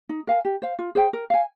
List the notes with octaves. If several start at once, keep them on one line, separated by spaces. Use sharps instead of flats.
D#4
A#4 F5 G#5
G4
C5 F5
F4
G#4 C5 G5
A#4
F5 G#5